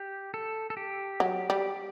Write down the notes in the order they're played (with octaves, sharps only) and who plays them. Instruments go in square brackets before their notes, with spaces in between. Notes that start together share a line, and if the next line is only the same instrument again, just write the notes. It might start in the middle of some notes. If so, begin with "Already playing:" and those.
Already playing: [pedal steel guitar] G4
A4
A4
G4
[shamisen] F#3
G3